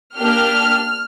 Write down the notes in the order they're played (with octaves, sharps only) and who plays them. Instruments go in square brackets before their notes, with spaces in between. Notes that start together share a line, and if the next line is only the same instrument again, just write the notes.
[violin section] A#3 D4 G4 F6